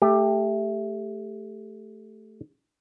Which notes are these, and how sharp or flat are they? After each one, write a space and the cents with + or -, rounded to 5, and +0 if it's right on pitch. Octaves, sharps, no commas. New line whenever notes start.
A3 +0 G4 +20